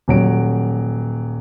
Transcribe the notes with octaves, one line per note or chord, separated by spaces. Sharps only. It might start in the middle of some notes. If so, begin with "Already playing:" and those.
D#1 F#3 D7